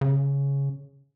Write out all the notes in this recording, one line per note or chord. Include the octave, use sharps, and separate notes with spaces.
C#3